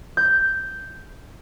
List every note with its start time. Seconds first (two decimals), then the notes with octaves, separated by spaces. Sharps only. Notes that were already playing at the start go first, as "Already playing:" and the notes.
0.17 G6